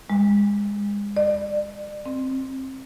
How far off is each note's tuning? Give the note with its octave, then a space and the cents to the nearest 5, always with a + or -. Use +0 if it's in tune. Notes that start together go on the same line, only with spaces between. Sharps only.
G#3 -30
D5 +35
C4 +20